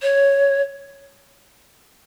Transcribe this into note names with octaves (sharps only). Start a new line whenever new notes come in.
C#5